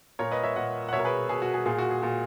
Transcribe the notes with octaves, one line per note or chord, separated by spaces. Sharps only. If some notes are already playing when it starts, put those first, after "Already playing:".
A#2 A#4 C#5
B4 D#5
C#5 E5
A#2 D#5 F#5
F#5
B2 C#5 E5
A#4
G#4 B4
B2 G#4
F#4
G#4
A#2 G#4
F#4
G#4
A#2